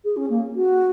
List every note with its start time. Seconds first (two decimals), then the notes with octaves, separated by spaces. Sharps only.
0.04 G#4
0.16 C#4
0.29 A#3
0.55 F#4